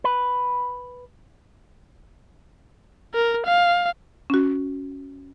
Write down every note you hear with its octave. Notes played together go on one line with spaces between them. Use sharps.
B4
A#4
F5
C#4 F#4